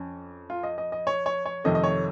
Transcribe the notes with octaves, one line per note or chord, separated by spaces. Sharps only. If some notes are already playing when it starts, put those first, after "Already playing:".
Already playing: F2 C#4
F4
D#5
D#5
D#5
C#5
C#5
C#5
F2 C3 D#3 A3 D#5
D#5
C#5